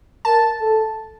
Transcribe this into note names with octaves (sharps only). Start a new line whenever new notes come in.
A#4 A5
A4